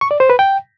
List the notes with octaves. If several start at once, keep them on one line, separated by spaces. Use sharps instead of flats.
C#6
D5
C5
B4
G5